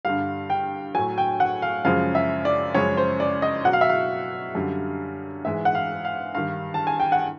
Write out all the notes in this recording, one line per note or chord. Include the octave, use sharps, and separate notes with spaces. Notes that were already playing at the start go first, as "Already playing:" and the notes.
G2 D3 G3 F5
G5
A2 F#3 G#5
G5
F#5
F5
F#2 C#3 F3 G#3 F5
E5
D5
F#2 C#3 F3 G#3 C#5
C5
D5
D#5
B2 F#3 F#5
F5
E5
F5
F#2 D3 G3
G#2 E3 G#3 E5
F#5
F5
F5
G2 D#3 G3 F5
A5
G#5
G5
F#5